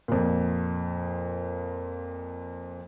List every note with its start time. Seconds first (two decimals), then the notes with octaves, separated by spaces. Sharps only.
0.08 F2 A#2